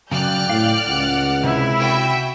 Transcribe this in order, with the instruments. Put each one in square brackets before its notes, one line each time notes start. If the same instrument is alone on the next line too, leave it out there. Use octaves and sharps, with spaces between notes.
[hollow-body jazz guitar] F#2 C#3 [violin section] D5 F6 F#6 [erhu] G5
[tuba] A2 [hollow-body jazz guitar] F5
[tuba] C#2 [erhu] F#5
[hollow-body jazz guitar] C3 [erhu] E4
[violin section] F#4 E5 G5